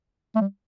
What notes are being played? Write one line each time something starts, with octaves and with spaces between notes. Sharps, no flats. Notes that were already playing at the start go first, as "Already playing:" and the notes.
A3
G3